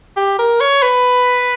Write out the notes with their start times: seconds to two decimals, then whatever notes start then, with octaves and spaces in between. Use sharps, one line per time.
0.16 G4
0.39 A#4
0.60 C#5
0.82 B4